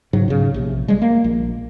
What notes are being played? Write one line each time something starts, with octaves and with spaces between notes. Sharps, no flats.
G#2 C#3 F#3
B1 G#2 C#3
A#1 C3
G3 G#3
A#3
A#1